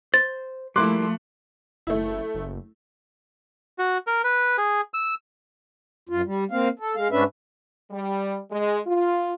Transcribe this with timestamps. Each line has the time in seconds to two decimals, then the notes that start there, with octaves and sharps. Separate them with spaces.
0.14 C5 A6
0.76 F3 G3 A3 A#3 E4 C6 D6 F#6
1.87 F#1 A3 E4
2.34 F#1
3.78 F#4
4.07 A#4
4.24 B4
4.58 G#4
4.94 E6
6.09 F#2 F4
6.25 G3
6.51 A#3 C4 F5
6.79 A4
6.95 G#3 F5
7.11 G#2 C#4 D4 B4 E5
7.91 G3
8.51 G#3
8.86 F4